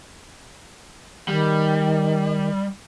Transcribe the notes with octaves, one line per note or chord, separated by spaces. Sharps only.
D#3 G3